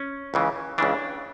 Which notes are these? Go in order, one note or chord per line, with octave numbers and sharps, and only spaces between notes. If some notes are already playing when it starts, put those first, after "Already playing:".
Already playing: C#4
C#2 C#3 E3
C#2 C#3 E3 D4